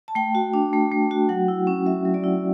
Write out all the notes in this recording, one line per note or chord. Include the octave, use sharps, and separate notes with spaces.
A5
A3 G5
F#4
D4
A3
A3
F#4
F#3 F#5
E4
C#4
F#3 E5
F#3
D5
E4